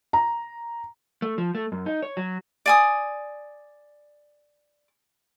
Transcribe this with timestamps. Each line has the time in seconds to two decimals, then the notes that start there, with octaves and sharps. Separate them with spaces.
0.13 A#5
1.22 A3
1.38 F3
1.55 A3
1.72 F#2
1.86 D#4
2.02 C#5
2.17 F#3
2.66 D5 G#5 D#6